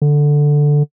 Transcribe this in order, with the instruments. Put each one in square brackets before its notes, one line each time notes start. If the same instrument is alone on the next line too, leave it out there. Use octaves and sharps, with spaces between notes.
[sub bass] D3